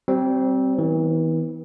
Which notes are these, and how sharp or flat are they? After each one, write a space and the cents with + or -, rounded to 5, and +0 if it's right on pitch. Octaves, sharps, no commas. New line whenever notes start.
G3 -35 C4 +0
E3 -40 B3 +0